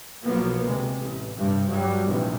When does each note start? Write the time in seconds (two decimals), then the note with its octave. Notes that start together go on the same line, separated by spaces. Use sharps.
0.25 B1 F3 F#3 A#3 B3
0.65 D2 C3 G#3
0.96 A1
1.36 G1 G2 C3
1.67 G2 F#3 G3
2.06 A#1 E2 G#2 C3